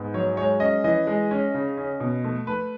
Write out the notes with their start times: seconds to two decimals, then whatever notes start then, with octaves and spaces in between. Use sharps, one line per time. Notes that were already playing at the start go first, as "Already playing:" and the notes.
Already playing: G#2 B3
0.14 F#3 C#5
0.37 G#3 C#5
0.60 C#4 D#5
0.84 E3 D#5
1.07 G#3
1.31 C#4
1.54 C#3
1.77 C#4
2.00 B2
2.24 A3
2.47 A3 B4